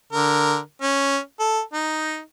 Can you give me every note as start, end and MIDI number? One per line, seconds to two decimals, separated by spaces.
0.12 0.58 50
0.12 0.58 70
0.82 1.19 61
1.40 1.61 69
1.73 2.20 63